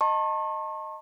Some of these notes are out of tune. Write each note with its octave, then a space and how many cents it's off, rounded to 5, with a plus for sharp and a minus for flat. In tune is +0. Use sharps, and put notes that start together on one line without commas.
D#5 +0 A5 +25 C#6 -40